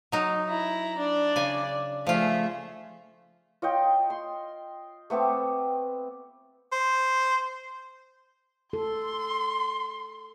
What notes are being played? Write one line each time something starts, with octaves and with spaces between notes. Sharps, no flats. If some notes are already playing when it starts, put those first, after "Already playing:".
F#3 D#4
E4 A#5
D4 D5
C#3 G#5
F3 A3 F4 G#4 E5
F4 C#5 D#5 G5
C6
A3 B3 C4 D6
C5
A4 C6